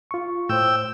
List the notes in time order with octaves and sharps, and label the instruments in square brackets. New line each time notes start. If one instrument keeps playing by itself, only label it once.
[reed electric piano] F4 C#6
[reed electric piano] A2 C5 [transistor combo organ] G5 E6